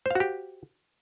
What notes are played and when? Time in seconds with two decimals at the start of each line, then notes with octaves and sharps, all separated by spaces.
0.06 C5
0.11 F5
0.15 F#4
0.20 G4